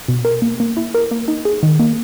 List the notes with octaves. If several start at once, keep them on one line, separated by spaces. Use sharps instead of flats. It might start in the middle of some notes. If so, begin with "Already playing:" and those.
B2
A#4
A#3
A#3
E4
A#4
A#3
D#4
G#4
D#3
A#3